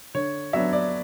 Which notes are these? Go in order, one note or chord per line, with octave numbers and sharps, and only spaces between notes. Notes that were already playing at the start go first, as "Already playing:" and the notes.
D3 C#5
F#3 B3 D4 E5
D5